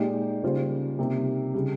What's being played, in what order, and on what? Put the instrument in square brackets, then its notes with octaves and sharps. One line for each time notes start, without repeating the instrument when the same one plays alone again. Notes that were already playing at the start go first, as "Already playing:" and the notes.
Already playing: [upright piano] A#2 G#3 D#4 G4
C#3 G3 A#3 F4 C5
C3 G3 A#3 D#4
C#3 G3